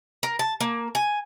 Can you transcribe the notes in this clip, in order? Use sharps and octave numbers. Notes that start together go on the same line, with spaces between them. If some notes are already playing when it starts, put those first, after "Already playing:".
A#4
A5
A#3
G#5